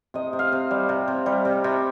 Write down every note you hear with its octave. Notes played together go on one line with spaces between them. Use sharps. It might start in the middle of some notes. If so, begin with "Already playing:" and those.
C3 D#5
C3
F5
C3
G3
C3
C3
G3
C3
C3